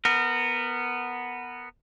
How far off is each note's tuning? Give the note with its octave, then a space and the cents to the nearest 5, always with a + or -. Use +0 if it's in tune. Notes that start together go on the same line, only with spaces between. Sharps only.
B3 +0 A#4 -20